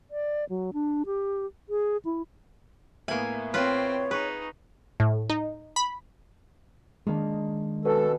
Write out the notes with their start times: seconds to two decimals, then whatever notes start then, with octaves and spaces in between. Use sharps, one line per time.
0.11 D5
0.50 F#3
0.73 D4
1.06 G4
1.69 G#4
2.05 E4
3.08 A2 A#3 B3 E5 G#5
3.54 C4 F4 B4 C#5 G5
4.11 D#4 G#4 B4 C#6
5.00 A2
5.30 D#4
5.76 B5
7.07 D#3 G#3 A#3 B3 D4
7.85 B2 C#4 A4